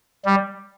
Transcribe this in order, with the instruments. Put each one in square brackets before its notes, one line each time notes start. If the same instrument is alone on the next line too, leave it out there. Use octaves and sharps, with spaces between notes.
[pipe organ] G3